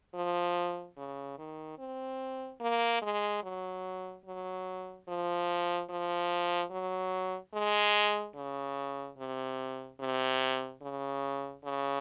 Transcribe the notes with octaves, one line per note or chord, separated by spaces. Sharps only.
F3
C#3
D#3
C4
A#3
G#3
F#3
F#3
F3
F3
F#3
G#3
C#3
C3
C3
C#3
C#3